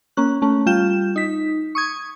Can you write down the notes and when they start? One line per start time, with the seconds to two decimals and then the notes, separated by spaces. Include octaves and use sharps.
0.17 A#3 C#4 F#6
0.42 A3 C#4
0.66 G3 F4 G6 E7
1.16 D#4 B6
1.75 C#6 D#6 G#6